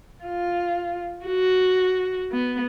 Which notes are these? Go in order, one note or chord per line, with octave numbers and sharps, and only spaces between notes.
F4
F#4
B3